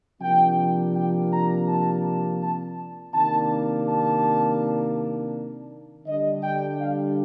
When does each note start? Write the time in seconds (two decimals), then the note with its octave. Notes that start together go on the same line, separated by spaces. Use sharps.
0.21 C3 F3 A#3 D4 G5
0.94 G5
1.31 A#5
1.68 A5
2.41 A5
3.14 C3 D#3 A#3 D4 A5
3.87 A5
6.06 D3 G3 D4 D#5
6.43 G5
6.80 F5